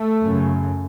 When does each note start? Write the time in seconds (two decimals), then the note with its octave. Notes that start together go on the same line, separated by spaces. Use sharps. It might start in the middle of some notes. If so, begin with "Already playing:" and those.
Already playing: A3
0.24 F#2 C#3